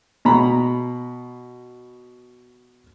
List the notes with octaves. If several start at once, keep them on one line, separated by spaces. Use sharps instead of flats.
B2 A#5 B5